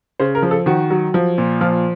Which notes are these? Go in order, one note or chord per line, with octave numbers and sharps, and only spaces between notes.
C#3 C5
A#4
F3
A4
D#3 F#4
F#3
F3
A#2
F3 F4